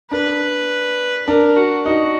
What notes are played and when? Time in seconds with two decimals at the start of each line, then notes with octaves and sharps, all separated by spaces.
0.11 D4 B4
1.28 D4 A#4
1.57 F#4
1.86 D#4 F#4